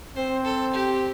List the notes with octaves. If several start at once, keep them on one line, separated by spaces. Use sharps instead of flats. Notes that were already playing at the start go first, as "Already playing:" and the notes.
C4 C5
A4
G4